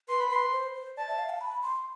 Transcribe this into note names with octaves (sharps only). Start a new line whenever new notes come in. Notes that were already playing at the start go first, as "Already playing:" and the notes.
B4 C6
B5
B4 C6
C5
C5
D5 A5
E5
F5
A5
B5
C6